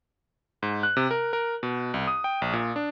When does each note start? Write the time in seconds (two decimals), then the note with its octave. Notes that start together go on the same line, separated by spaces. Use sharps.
0.63 G#2
0.83 F#6
0.97 C3
1.11 A#4
1.33 A#4
1.63 B2
1.94 C2
2.07 D#6
2.24 G5
2.42 A#1
2.53 A#2
2.76 D4